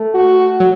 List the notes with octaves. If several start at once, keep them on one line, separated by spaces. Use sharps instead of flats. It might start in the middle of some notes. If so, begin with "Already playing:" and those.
Already playing: A3
F#4
F#3